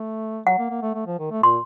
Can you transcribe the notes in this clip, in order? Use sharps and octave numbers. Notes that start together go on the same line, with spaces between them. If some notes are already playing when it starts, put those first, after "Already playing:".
Already playing: A3
F#3 F#5
A#3
A#3
A3
A3
F3
D#3
A3
A#2 C6